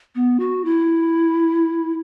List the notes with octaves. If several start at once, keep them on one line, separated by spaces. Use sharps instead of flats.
B3
F#4
E4